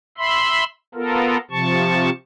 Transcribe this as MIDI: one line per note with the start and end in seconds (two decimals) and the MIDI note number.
0.18 0.64 76
0.18 0.64 83
0.18 0.64 84
0.95 1.37 59
0.95 1.37 65
0.95 1.37 69
0.95 1.37 70
1.51 2.10 48
1.51 2.10 53
1.51 2.10 81
1.51 2.10 85